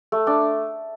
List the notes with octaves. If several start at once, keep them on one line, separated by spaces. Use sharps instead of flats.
A3
D4